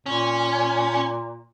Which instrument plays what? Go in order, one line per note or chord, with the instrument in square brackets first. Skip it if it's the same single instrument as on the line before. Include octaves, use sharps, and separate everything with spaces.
[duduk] A#2 [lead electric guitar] C#4